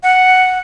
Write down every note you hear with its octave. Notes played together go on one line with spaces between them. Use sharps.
F#5